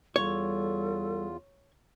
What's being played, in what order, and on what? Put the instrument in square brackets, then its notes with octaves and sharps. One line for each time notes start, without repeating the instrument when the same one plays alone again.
[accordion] E2 F4 [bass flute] G3 [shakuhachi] A4 [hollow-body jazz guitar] C#5